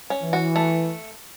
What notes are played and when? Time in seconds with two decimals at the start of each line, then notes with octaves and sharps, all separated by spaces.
0.10 C#4
0.21 E3
0.33 F#4
0.56 A3